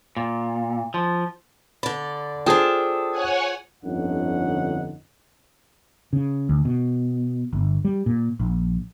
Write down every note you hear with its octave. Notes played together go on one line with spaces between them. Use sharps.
A#2
F3
D3 D5 B5
D4 F4 G#4 A4 C5 G5 D#6
C#5 F#5 G#5
G1 F2 D3 C#4 D#4 F#5
C#3
D2
B2
G1
G3
A#2
A#1